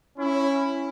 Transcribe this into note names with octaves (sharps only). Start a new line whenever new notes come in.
C#4 E4